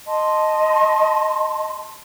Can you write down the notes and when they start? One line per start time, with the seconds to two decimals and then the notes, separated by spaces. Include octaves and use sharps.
0.06 D#5 A5 C6